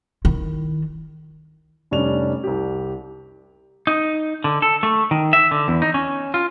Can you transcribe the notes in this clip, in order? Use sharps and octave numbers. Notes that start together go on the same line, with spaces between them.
D#3 E4
F1 G3 C#4 D4 F7
C2 G4
D#4
D3
A4
A3
D#3
E5
D3
E2
D#4
C#4
F4